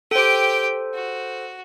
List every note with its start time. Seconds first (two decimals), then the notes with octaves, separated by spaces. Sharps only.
0.11 G4 A4 C5 G5
0.94 F#4